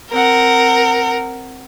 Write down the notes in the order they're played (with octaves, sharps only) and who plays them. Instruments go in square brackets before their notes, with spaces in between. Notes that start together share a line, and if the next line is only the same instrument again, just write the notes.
[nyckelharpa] C4 F#5 [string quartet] A#4